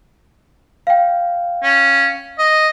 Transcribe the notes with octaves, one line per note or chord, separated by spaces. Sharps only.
F5 G5
C#4
D#5